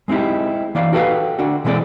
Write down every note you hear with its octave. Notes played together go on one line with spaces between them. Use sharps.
G#3 C4 D#4 E4 G4
E3 A#3 D5 F5
D#4 F#4 G4 A4 B4 F5
D3 D4 F#4
B2 E3 G#3 C4 A4 D5